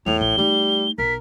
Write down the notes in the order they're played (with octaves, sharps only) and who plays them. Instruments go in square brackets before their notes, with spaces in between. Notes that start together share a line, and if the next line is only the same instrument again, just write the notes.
[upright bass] E2 A3 [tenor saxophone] A2 [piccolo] F7
[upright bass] A1 [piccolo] G7
[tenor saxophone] G3 [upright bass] A3 D#4
[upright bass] B1 [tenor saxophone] A#4 [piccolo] B6